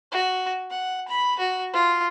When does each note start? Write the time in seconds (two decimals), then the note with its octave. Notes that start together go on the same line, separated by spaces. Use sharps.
0.12 F#4
0.70 F#5
1.08 B5
1.39 F#4
1.73 F4